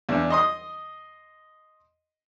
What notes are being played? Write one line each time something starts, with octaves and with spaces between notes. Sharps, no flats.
E2 D4
D#5 C6 D#6